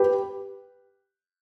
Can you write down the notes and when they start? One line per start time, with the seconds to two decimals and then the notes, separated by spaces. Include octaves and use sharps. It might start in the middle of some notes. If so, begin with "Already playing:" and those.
Already playing: G4 B4